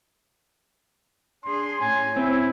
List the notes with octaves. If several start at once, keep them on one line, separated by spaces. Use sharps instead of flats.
D4 G#4 C6
A2 C#4 G#5
C4 E4